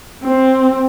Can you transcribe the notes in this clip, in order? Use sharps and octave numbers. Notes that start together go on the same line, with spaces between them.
C4